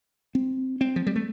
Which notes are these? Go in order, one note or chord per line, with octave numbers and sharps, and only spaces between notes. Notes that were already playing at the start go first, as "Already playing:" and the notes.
C4
C4
F3
G3
A3